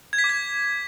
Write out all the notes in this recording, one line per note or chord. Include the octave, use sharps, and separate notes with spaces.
G#6
B6
D6
G#6